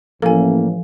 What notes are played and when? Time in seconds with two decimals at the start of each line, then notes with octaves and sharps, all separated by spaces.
0.22 A1 F3 A#3 A4 G#5